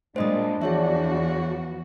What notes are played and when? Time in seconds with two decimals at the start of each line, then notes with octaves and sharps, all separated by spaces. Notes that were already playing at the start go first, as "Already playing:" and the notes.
0.16 A#2 G3 G#3 D4 C5 D#5 D#6
0.62 E2 F3 F#4 G#4 C#5 E5